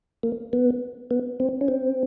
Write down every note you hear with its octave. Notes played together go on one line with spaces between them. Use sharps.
A#3
B3
B3
C4
C#4
C4